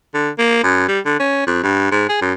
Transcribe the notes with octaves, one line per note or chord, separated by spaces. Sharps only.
D3
A#3
F#2
G3
D3
C#4
F2
G2
G#2
G#4
F#2